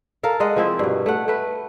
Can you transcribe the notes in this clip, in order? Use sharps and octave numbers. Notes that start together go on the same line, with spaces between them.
A4 A#4 F5
G#3 D#5 F#5
F3 C4 E4
G2 B2
A3 F#5
A3 B4